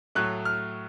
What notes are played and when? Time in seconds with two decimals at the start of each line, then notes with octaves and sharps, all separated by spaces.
0.15 A2 F#3 A3 F#6
0.45 F6